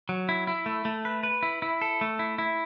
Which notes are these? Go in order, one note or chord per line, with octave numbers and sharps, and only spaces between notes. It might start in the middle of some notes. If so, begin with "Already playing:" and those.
F#3
E4
E4
A3
A3
B4
B4
E4
E4
A4
A3
E4
E4